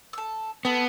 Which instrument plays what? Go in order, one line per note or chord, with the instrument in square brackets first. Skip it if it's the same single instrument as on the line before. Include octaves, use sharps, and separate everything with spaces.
[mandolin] A4 E6
[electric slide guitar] B3 [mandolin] A4 C#5